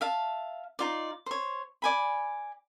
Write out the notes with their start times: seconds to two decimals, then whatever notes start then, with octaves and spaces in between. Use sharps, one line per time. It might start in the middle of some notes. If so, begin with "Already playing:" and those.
0.01 E5 F5 A5
0.79 D#4 F4 D5
1.26 C5 C#5
1.82 D5 G#5 B5